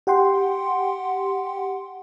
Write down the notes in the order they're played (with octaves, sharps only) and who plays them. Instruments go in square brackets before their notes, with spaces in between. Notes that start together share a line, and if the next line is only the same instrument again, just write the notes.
[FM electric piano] G4 F#5 G5 C6